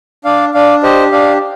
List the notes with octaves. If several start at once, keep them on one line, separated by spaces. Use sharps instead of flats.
D4 D5 F5
D4 D5 F5
G4 C5 D#5
D4 D5 F5